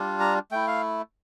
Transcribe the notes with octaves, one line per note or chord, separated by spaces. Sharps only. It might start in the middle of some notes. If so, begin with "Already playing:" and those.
Already playing: G3 D4 F4
A#5
A3 E4 G5
F5